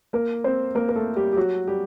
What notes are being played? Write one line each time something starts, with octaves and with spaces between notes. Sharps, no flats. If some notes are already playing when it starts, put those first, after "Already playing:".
A#3 A#4
C4 C5
A#3 A#4
A#4
A3 A4
G3 G4
G4
F#3 F#4
G3 G4